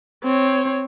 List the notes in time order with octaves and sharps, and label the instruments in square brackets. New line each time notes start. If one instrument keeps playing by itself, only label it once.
[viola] C4 C#5